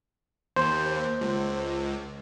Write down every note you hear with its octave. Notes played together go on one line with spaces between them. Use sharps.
D#2 C5
C#2